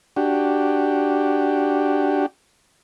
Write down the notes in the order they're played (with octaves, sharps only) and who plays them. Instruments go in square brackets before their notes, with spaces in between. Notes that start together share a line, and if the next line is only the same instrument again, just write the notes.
[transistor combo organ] D4 F#4 G4